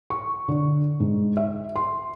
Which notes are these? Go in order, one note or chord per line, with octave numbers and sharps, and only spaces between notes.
C#6
D3
G#2
E5
C6